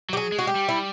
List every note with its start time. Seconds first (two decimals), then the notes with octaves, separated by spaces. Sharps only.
0.09 F#3 G4
0.17 G#4
0.32 G#3
0.38 F#4
0.47 G4
0.55 G3
0.69 E4